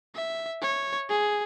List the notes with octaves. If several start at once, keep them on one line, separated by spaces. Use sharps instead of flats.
E5
C#5
G#4